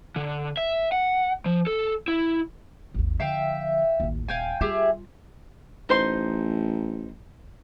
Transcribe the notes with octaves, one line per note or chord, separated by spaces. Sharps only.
D3
E5
F#5
F3
A4
E4
G#1 D#2
D3 F3 E5 F5 G5
A1 D#2
D#1 F5 G5 G#5
G3 F4 G4 G#4 E5
A1 D#4 C5 C6